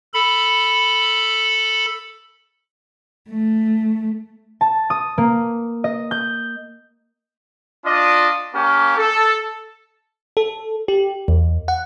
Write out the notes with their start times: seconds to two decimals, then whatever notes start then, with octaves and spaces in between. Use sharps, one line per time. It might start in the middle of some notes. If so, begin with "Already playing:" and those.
0.14 A4 B5
3.30 A3
4.61 A5
4.90 D#6
5.18 A#3
5.84 D#5
6.11 G6
7.86 D4 F4 D5 D#5
8.54 A#3 C#4 G4
8.97 A4
10.37 A4
10.88 G4
11.28 E2
11.68 F#5